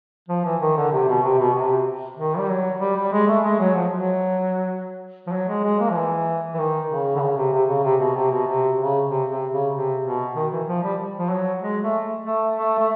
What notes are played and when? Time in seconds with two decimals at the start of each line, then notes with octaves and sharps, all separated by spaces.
0.29 F3
0.45 E3
0.61 D#3
0.77 D3
0.92 C3
1.08 B2
1.23 C3
1.38 B2
1.54 C3
2.17 D#3
2.38 G3
2.49 F#3
2.80 G3
2.96 G3
3.12 G#3
3.27 A3
3.44 G#3
3.59 F#3
3.75 F3
3.91 F#3
5.27 F3
5.32 F#3
5.48 G#3
5.64 G#3
5.80 A#3
5.89 F3
5.95 E3
6.54 E3
6.59 D#3
6.89 C#3
7.15 D3
7.21 C#3
7.37 C3
7.52 C3
7.68 C#3
7.84 C3
8.00 B2
8.16 C3
8.31 B2
8.46 C3
8.79 C#3
9.09 C3
9.30 C3
9.52 C#3
9.73 C3
10.04 B2
10.35 D#3
10.52 E3
10.68 F3
10.83 G3
11.18 F3
11.30 F#3
11.62 G#3
11.82 A3
12.25 A3
12.56 A3
12.79 A3